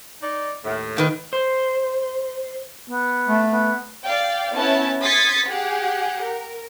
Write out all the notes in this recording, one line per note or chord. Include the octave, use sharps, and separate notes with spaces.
D#4 D5
D#2 A2
A#2 D#3 B4
C5
B3
A3
B3
D5 F5 G5
B3 C#4 E4 E5 A5
C6 D#6 G#6 A6 B6 C#7
G4 G#4 F#5
A#4